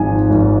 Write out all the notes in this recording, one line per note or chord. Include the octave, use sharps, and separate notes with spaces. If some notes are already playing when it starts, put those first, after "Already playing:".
Already playing: G#1 G#2 F3 G#5
G#1